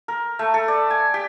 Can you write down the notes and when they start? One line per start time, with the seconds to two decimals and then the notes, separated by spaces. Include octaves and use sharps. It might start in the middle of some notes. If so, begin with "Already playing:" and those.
0.08 A#4
0.39 A3
0.54 A4
0.68 D5
0.90 G#5
1.14 G4